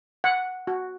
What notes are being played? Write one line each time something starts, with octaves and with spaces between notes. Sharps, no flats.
F#5
F#4